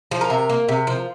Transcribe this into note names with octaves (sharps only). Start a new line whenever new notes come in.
F3
A#4
C3
A#3
C3
F3